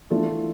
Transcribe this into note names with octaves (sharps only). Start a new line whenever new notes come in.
E3 A3 D4 F4 A4